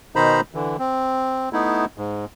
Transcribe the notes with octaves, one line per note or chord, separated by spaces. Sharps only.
B2 D#3 D#4 C5 A#5 B5
D3 E3
C4
A3 B3 D#4 E4
G#2